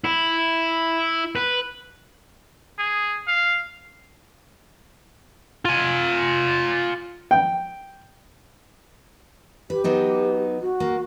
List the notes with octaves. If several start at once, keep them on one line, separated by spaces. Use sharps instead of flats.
E4
B4
G#4
F5
F4 G#5
G5
G4 B4
F#3 B3 D#4
F#4
A#3